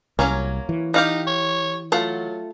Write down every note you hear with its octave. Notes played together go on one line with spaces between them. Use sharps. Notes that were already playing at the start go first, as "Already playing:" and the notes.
C2 F#3 A#3 C#4
E3
D#4 G4 F5 F#5
C#5
F#3 A3 F4 F#5